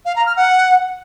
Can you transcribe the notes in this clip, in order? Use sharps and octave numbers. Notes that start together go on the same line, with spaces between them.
F5
A#5
F6
F#5